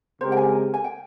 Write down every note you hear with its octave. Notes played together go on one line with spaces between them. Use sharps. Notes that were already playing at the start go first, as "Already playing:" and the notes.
C#3 G#3 C4 G4 A#4 C5
G5
G#5
G#5
G5